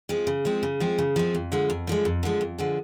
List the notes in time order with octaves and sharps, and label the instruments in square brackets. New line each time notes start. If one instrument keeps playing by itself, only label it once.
[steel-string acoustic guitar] F3 G#3 C4
C#3
F3 G#3 C4
C#3
F3 G#3 C4
C#3
F3 G#3 C4
F2
D3 F3 G#3
F2
D3 F3 G#3
F2
D3 F3 G#3
F2
D3 F3 G#3